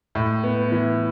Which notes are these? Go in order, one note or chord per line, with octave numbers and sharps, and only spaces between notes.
A2
B3
E3